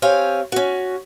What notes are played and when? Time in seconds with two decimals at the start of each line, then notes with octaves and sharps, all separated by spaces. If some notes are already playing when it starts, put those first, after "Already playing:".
0.02 C4 G4 C#5 F5 G#5
0.52 C#4 F#4